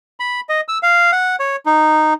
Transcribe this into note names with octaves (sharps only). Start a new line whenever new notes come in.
B5
D#5
E6
F5
F#5
C#5
D#4